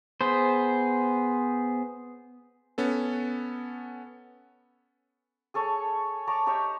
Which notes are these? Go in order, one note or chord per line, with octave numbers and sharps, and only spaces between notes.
B3 G#4 C5
B3 C#4 A4
G#4 A4 C#5 A5
C#5 D5 A5 A#5
D#4 G4 C#5 E5